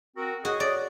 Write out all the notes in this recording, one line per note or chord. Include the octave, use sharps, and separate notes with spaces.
C4 F#4 A#4
F#4 G#4 D#5
D5